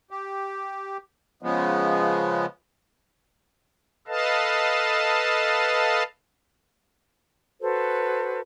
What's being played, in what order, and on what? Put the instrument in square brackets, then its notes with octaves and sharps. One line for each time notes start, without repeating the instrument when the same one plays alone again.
[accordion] G4
C#3 F3 G#3 B3
[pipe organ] A4 B4 D#5 F5 A5
[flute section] F#4 A4 B4 C5